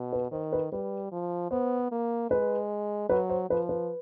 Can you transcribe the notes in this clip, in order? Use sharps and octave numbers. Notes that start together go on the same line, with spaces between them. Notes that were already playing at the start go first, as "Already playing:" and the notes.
Already playing: B2
B4
D#3 C5
B4
G3 B4
F3
B3 C5
A#3
G#3 B4
F#3 B4
C5
F3 B4
B4